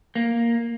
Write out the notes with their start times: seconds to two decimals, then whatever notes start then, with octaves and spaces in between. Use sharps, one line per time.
0.15 A#3